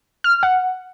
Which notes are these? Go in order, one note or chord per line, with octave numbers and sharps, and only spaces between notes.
F6
F#5